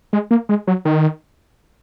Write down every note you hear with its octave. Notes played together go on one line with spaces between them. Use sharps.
G#3
A#3
G#3
F#3
D#3